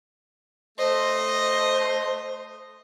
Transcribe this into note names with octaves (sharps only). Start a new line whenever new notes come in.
A3 C5 D#5